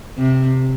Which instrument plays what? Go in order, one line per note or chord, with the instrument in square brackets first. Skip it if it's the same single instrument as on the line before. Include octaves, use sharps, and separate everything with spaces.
[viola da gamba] C3